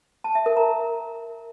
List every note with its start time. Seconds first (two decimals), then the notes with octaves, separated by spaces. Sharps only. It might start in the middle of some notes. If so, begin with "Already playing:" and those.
0.24 A5
0.35 E5
0.46 A#4
0.57 A#5